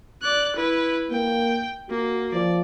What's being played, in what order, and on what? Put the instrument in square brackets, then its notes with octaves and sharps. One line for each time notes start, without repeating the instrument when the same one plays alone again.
[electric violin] D5 F#6
E4 B4
[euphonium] A#3 [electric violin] G5
[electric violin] A#3 [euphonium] F#4
[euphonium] F3 [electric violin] D5